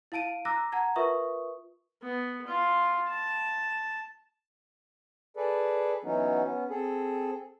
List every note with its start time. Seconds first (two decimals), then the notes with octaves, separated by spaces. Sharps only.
0.12 E4 F5 A5 D7 D#7
0.45 A#5 D6 E6 F#6 A#6
0.72 F#5 A5 A#5 G#6
0.96 F4 A#4 B4 E5 C#6 D#6
2.03 B3
2.47 F4
3.09 A5
5.37 G#4 A4 B4 D5
6.04 E3 F#3 B3 C#4 D#4
6.43 B3 C#4
6.70 C4 G#4 A4